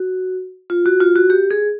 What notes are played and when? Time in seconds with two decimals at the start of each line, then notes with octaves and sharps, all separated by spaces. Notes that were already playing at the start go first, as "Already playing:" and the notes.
Already playing: F#4
0.70 F4
0.86 F#4
1.00 F4
1.16 F#4
1.30 G4
1.51 G#4